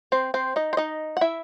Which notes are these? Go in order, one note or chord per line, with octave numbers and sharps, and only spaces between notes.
C4 C5
C4 C5
D#4 D#5
C5
D#4 D#5
F#5
E4 E5